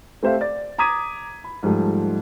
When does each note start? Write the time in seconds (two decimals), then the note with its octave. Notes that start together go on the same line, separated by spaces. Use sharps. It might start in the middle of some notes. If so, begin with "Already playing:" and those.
0.23 A3 C4 G4 C5 E5 F5
0.41 D5 A6
0.78 A#5 D6 D#6 G#6 B6 D#7
1.44 B5
1.63 G#2 F3 G3 A3